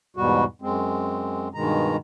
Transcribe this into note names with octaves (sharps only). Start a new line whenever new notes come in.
E2 G#2 B2 G3 F#4
F#2 G#3 C4
G2 B2 D#3 G#3 A#5